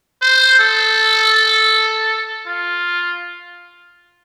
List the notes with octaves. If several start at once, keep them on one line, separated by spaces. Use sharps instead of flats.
C5
A4
F4